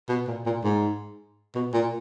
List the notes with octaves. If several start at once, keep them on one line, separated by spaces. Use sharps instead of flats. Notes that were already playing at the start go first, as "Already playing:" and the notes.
B2
A#2
A#2
G#2
B2
A#2